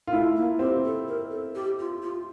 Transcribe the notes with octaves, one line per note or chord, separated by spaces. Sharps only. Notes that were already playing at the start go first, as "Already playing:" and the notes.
F4
A3 E4
A#3
C4 G4
A4
A#4
A4
G4
F4
F4